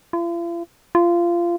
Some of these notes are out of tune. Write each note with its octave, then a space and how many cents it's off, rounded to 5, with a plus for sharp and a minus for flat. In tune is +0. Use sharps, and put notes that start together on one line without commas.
F4 -45
F4 -20